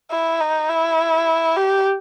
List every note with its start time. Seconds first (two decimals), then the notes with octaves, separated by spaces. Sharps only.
0.11 E4
0.40 D#4
0.69 E4
1.57 G4